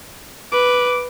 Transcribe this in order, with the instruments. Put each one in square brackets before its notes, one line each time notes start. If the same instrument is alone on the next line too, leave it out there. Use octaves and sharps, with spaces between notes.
[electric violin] B4 [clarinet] D6